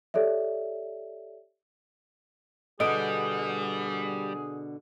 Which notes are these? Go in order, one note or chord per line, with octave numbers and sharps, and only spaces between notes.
G4 A4 C#5 D5 E5
B2 D3 G3 G#4 D#5 D#6 D7